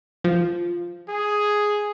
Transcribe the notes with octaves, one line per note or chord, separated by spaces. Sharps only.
F3
G#4